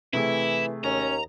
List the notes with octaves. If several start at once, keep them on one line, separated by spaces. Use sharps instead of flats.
C3 E3 A3 E4 G#4
D#2 C#4 A#5